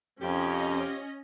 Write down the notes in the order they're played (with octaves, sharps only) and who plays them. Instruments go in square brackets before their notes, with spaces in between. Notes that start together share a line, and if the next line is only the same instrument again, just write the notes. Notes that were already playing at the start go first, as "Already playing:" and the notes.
[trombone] F2 [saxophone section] C3 F4 G4 [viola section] C#4 D#5